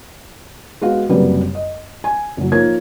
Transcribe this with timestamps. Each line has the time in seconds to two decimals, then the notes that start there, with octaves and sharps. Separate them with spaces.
0.82 G#3 B3 F#4 F5
1.09 F#1 F#2 C3 F#3 G3 B4
1.55 D#5
2.04 G#5
2.37 F#1 F#3
2.52 F3 A#3 D#4 A#4 C#5 G#6